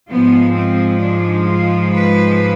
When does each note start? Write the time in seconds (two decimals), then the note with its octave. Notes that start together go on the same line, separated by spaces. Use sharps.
0.10 G#2 F3 G#3 B3
0.56 C4
1.03 D4
1.48 F4
1.94 B4